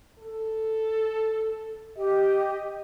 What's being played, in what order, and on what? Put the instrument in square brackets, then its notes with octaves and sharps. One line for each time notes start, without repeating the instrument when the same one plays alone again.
[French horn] A4
[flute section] G4 [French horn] D#5